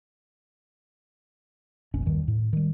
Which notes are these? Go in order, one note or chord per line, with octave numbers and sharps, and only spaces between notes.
F1 A#1 C#4
D#1 G2 D#3
A2
D#3 G3